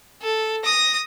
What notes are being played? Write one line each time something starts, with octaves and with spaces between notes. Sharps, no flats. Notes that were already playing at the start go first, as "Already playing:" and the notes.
A4
D#6 A#6